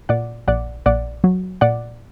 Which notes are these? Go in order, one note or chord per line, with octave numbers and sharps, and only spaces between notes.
A#2 D5 F#5
A#1 D5 F#5
A#1 D5 F#5
F#3
A#2 D5 F#5